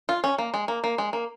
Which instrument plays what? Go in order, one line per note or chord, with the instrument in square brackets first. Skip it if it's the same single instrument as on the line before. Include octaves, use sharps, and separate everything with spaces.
[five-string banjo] F4
C#4
A#3
G#3
A#3
A#3
G#3
A#3